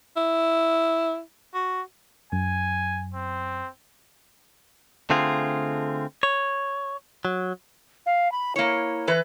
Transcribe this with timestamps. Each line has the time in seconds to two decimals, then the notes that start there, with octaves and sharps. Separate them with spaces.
0.17 E4
1.54 F#4
2.32 F#2 G#5
3.14 C4
5.10 D3 A3 C4 F4 G#4
6.23 C#5
7.25 F#3
8.06 F5
8.32 B5
8.56 A#3 E4 C#5
9.07 E3 B4